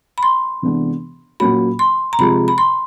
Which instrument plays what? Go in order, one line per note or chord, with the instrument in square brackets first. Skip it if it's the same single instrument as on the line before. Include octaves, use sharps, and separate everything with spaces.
[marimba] B5
C6
[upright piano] C3 E3 G#3 B3 D4
[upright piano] A#2 F#3 A#3 C#4 F#4 [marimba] B5
[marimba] C6
A#5
[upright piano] C3 F3 G#3 [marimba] B5
[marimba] B5
C6